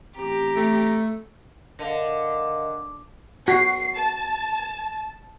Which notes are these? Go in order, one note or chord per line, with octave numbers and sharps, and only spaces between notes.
A1 C4 G4 A#5
A3
D3 A#4 D#5 F5
F#4 C7
A5